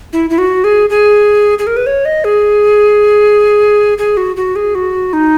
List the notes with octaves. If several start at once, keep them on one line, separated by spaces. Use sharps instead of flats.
E4
E4
F#4
G#4
G#4
G#4
A#4
B4
C#5
D#5
G#4
G#4
F#4
F#4
G#4
F#4
D#4